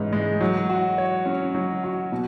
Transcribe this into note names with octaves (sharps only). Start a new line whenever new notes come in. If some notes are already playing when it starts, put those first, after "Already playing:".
Already playing: G#2 E3 G#3 C#4
G#3
F#3
F#4
C#5
C#4
F#3
F#4
B2